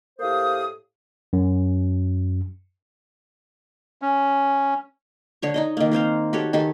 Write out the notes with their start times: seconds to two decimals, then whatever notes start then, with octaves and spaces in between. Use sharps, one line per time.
0.19 A2 A#3 G4 C5 F5 D#6
1.33 F#2
4.02 C#4
5.42 D3 C#5 C#6
5.54 D#4 C#5 D#5
5.77 D#3 A#3
5.91 A#3 C4 C5 F5
6.33 F#4 G4 A4 C#5
6.53 D#3 G4 A4 G#5